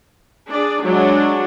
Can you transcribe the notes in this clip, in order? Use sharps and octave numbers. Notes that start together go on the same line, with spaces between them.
D4 G#4 D5
F#3 G#3 D4 F#4